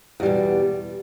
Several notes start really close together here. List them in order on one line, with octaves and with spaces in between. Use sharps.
E2 G3 B2